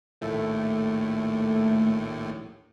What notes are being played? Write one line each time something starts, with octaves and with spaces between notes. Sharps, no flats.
A#1 D#2 A2 A3